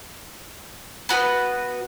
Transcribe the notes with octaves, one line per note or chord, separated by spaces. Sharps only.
B3 F#4 A4 B4